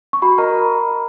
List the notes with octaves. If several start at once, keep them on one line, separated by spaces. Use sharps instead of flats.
C#6
F#4 B5
A#4 D#5 A#5